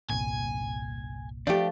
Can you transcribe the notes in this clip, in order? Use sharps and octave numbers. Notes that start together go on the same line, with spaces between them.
G1 C2 A#2 G#5
F3 A3 D4 G4